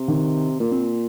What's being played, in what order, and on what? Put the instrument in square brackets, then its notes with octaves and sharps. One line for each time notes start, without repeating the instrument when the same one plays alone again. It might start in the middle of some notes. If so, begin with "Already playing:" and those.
Already playing: [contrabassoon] C3
[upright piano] D#3
[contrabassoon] A#2 [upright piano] A#3
[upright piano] C4